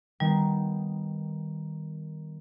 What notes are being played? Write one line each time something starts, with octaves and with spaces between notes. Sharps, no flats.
D#3 G3 B3